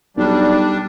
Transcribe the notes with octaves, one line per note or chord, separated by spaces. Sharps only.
B1 G3 D4